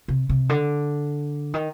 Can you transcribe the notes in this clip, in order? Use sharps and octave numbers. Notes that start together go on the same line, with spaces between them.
C3
C3
D3
D#3